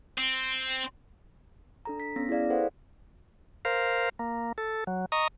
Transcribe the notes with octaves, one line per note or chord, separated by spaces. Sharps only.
C4
D4 A4 A#5
B6
B3 C#4 A#6
E4 G#4 D5 F5
A4 B4 C5 F5 F#5
A#4 C5 F5
A#3
A4
F#3
D#5 A#5 C#6 D#6